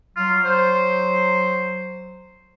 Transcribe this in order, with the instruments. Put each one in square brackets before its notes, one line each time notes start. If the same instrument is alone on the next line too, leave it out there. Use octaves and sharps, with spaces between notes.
[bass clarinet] F#3 [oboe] F4
[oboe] C5